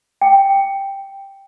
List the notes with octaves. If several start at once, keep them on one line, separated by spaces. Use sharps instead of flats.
G5